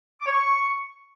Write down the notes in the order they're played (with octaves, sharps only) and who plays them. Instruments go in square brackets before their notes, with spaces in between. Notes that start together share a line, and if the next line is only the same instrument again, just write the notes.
[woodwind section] D6
C#5
C#6